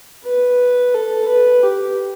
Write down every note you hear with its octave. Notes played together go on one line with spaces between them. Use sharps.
B4
A4
B4
G4